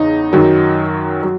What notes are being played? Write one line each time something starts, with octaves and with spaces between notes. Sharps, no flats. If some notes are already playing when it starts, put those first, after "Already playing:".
Already playing: E2 C#3 D#4
F#2 D#3 F#3
F#3